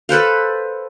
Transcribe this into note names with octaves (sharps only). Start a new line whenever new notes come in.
A4 B4 C5 F5